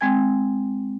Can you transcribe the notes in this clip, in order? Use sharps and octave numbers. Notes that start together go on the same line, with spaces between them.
G#3 C4 G5 G#5 G#6